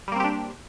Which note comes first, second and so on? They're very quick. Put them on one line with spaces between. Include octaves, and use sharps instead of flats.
G3 A#3 C4 G4 D4